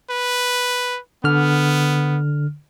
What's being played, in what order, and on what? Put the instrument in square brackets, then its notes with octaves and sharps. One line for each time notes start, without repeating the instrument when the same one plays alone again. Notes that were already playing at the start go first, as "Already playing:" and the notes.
[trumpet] B4
[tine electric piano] D3 F6 [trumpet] B3